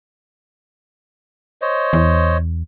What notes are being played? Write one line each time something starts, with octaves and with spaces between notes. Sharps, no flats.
C5 C#5 D#5
E2